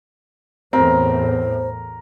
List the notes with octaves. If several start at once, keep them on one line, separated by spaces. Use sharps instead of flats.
E2 A2 C4 A#4 C5